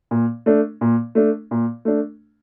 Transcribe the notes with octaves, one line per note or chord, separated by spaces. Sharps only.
A#2
A3 D4
A#2
A3 D4
A#2
A3 D4